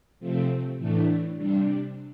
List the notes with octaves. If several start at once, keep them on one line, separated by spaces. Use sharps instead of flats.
C3 F3 A3 C4
A2 E3 A3 D4
C3 G3 D4